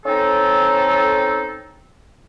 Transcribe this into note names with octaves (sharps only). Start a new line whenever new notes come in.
C4 C#4 D#4 A4